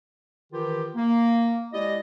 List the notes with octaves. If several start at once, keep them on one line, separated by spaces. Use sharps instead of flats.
D#3 E3 F4 G4
A#3
G#3 E4 G4 D5 D#5